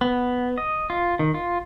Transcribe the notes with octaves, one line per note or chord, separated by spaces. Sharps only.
B3
D#5
F4
D#3
F4